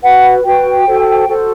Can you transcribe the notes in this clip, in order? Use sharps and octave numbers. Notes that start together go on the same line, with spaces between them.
F#4 B4 F#5
F#4 B4 G5
F#4 A4 C5
F#4 A4 C5